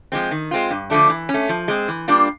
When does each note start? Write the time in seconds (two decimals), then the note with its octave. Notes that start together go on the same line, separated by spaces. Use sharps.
0.12 F3 G#3 C4
0.31 D#3
0.51 G#3 C4 F4
0.71 G2
0.90 D3 F3 A3 D4
1.10 E3
1.29 C#4
1.34 A3
1.49 F3
1.68 G#3 C4
1.88 E3
2.08 G3 A#3 D4 F4